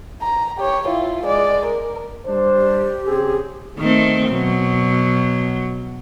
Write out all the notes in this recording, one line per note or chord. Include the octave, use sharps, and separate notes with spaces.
A#5
G4 C#5
E4 F4
G#3 D5
A#4
G3 D4 C5
G4
C#3 C4 G#4
D#3 A3 C4
B2 F#3